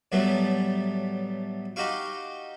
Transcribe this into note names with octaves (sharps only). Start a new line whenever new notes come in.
A2 F#3 G3 A3 B3
D#4 F#4 G4 F5 C#6